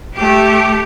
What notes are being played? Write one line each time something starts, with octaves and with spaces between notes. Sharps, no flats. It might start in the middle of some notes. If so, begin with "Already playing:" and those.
A3 G4